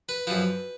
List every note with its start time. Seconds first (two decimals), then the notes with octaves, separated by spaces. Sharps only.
0.09 B4
0.27 F#2 F3 B4